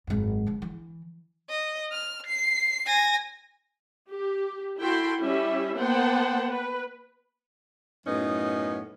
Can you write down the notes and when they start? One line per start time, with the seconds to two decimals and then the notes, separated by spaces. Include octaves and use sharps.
0.07 G#1 F#2
0.47 G#2 C#3
0.62 E3
1.50 D#5
1.92 F6
2.26 C7
2.86 G#5 A#6
4.10 G4
4.80 E4 F#4 A4 G5 C6
5.19 G3 C#4 E4 G4 E5
5.77 A#3 B3 C5 F#5 G5 A5
6.50 B4
8.07 F#2 A2 B3 C#4 D#4